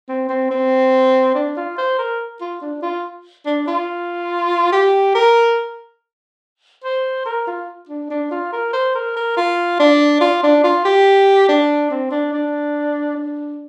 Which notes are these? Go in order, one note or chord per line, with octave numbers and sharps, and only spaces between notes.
C4
C4
C4
D4
F4
C5
A#4
F4
D4
F4
D4
F4
G4
A#4
C5
A#4
F4
D4
D4
F4
A#4
C5
A#4
A#4
F4
D4
F4
D4
F4
G4
D4
C4
D4
D4
D4